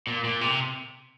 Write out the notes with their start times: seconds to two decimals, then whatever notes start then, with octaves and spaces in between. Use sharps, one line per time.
0.07 A#2
0.24 A#2
0.41 C3